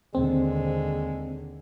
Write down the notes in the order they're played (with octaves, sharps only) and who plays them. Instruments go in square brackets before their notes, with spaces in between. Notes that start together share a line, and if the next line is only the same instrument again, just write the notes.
[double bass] D#2 D3 [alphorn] G#3 [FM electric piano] C4